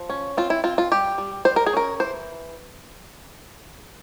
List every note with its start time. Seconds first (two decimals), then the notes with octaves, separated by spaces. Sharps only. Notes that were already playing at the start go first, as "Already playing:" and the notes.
Already playing: F3
0.10 C#4
0.37 C4 F4
0.50 E4
0.64 C4 F4
0.78 F4
0.92 G3 G4
1.18 G3
1.45 G3 C5
1.56 A#4
1.66 G#4
1.73 C#4 A#4
2.00 E3 C5